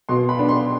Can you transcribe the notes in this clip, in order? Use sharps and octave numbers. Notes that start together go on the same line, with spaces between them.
B2 C6
B5
B3 D4
C6